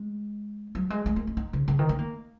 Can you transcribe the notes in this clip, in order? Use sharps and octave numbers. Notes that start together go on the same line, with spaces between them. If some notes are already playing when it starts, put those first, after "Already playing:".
Already playing: G#3
F#3
G#3
G#3
A#3
C#4
D#4
C#3
C#3
D#3
C#4
A#3